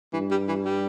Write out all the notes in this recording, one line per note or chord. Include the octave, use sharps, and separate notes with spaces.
G2 E3
G3
E3
G3